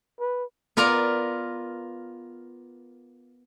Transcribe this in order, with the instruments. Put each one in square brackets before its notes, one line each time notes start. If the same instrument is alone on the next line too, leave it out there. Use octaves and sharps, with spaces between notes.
[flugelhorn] B4
[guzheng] B3 F4 A#4 D5 A#5